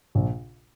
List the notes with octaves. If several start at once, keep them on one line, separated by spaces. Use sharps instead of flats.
A#1